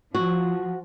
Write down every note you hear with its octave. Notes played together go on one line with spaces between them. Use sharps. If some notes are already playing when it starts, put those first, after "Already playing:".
F3 F#4